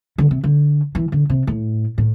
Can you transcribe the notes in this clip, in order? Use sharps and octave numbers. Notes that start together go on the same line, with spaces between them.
D3
C3
D3
E3
D3
C3
A2
A2